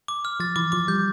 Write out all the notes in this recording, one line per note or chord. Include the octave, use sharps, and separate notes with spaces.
D6
F6
F3 A6
E3 D6
F3 D6
G3 G6